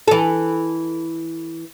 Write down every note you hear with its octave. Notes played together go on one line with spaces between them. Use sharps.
E3 A4